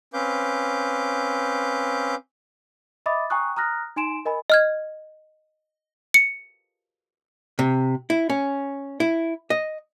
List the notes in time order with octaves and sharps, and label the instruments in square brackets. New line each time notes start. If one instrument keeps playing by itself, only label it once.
[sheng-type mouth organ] C4 C#4 B4 F5 D6 G6
[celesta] D#5 E5 B5 D6 D#6 A6
G5 G#5 A#5 C#6 D#6 F#6
A#5 D#6 F6 F#6 A#6
D#4 G#5 C6 D7 E7
A#4 D#5 G#5 B5
[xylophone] D#5 F6 G#6
C#7
[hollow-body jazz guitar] C3
E4
C#4
E4
D#5